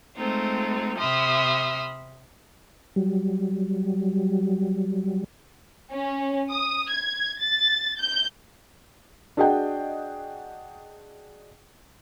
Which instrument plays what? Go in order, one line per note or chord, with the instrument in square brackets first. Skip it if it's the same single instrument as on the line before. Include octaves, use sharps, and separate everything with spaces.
[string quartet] G#3 A3 C4 D#4 F4
C3 E5 B5 C6 D#6 F6
[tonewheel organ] F#3 G3
[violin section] C#4
D#6
G#6
A6
G6
[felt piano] D4 F#4 G#4 D#5 F#5 G5